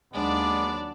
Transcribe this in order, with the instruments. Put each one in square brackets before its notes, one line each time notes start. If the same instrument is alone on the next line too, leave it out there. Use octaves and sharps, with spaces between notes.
[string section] D#2 F#3 [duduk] G#3 [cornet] B3 [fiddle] D4 D5